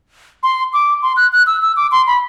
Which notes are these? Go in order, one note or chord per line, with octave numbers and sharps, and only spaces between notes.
C6
D6
C6
F#6
F#6
E6
E6
D6
C6
B5